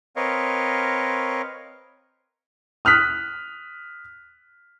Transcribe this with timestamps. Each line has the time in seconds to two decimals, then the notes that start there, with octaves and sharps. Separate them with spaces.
0.16 C4 A#4 B4 C#5 D#5 F5
2.85 D#6 F6 F#6 B6